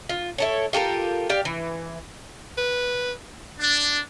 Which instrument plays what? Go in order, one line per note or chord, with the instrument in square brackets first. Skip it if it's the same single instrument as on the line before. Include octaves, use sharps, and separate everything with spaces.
[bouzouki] F4
E4 A4 C#5
F4 G4 A4 A#4
G4 D5 F5
E3
[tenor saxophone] B4
[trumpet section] D4